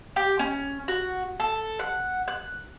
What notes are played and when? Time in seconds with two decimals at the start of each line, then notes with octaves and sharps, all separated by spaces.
0.16 G4
0.39 C#4
0.88 F#4
1.40 A4
1.79 F#5
2.28 F#6